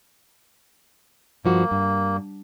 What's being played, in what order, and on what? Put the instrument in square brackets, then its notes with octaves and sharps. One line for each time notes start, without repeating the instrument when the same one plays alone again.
[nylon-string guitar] G2 F3 F#4 [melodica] A#3
[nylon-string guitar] G2